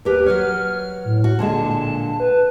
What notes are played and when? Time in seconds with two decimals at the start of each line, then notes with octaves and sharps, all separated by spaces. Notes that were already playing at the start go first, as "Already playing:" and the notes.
0.05 D#2 G4 A#4 B4
0.26 F#3 B4 C#5 F6
1.05 A2
1.24 F#4
1.39 A#2 D3 G#3 A5
2.20 B4